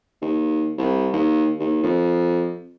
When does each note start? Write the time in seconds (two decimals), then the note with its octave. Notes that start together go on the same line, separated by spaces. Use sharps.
0.22 D#2
0.78 C2
1.13 D#2
1.60 D#2
1.83 F2